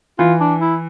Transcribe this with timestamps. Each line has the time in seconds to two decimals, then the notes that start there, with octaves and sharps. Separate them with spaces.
0.19 E3 F4
0.40 D4
0.61 E4